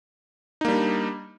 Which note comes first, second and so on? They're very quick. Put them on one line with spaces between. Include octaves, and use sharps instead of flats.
D#4 A#3 G3 D4